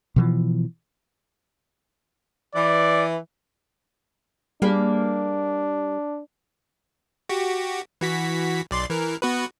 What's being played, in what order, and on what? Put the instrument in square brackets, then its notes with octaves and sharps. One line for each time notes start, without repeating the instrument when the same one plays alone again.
[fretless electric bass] B2 E3 F3
[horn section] E3 [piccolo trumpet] D5
[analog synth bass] G3 [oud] A#3 G#4 B4 [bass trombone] D4
[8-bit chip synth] F#4 G4
E3 F#4 B6
B1 D5 C6
E3 A#4
B3 F#4 B4